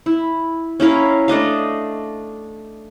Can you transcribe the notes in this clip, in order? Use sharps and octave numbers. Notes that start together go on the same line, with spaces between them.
E4
C#4 E4 A#4 F5
A3 D4 D#5 F5